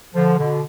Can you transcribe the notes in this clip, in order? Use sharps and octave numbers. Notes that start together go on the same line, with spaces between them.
D3 F3
B2 D3